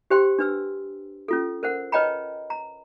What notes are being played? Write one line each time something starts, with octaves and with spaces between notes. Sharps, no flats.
G4 C5 G5 C6
D4 B4 E6
C#4 F4 A4
A#4 C5 F#5
B4 C#5 D#5 G5 A#5 B5
A#5